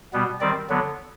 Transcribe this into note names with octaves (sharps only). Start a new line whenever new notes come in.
B2 G3 B3
D#3 G3 C4 D5
D3 F#3 B3